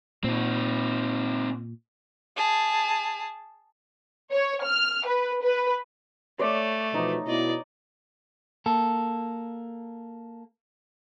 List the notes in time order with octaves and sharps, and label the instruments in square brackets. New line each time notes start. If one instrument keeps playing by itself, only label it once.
[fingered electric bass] A#2 [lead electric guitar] C4 D#4
[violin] G#4 A5
[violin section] C#5
F6
B4
B4
[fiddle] A3 [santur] C#5 D5
[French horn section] B2 E3 F3 [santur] D#4
[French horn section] B2 E4 [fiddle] D5 D#5
[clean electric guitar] A#3 A4